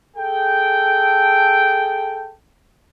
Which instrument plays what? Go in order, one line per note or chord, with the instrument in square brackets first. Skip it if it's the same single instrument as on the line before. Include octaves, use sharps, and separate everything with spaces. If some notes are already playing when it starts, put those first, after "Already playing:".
[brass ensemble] G#4 A4 G5